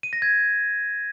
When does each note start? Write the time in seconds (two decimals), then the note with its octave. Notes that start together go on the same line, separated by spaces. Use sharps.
0.03 D#7
0.13 A#6
0.22 G#6